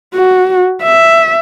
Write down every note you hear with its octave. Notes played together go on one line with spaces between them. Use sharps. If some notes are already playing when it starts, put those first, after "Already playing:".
F#4
E5